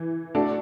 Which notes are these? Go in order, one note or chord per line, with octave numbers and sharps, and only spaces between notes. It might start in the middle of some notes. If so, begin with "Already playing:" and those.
Already playing: E3
A3 D4 F#4 A4 D5